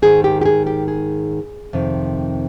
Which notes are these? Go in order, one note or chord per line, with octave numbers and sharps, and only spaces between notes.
G#2 D#3 G#4
G4
G4
G#4
G4
G#4
F2 C3 D#3